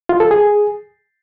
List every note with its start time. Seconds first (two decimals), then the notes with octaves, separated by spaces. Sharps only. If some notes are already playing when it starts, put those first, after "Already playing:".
0.09 F4
0.20 A4
0.31 G#4